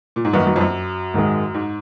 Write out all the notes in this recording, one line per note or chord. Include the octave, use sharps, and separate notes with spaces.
A#2
G#2
F#2 D#3 A#3 D#4 F#4 B4
F#2
F2
F#2
G#2 D#3 G#3
G#2